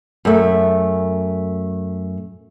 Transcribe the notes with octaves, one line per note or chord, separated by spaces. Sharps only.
F#2 A3